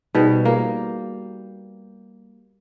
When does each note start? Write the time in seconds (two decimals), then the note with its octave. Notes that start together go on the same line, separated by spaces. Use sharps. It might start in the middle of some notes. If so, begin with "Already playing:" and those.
0.15 B2 G3 D#4 G#4 B4 C5
0.45 A#3 F4 G#4 F5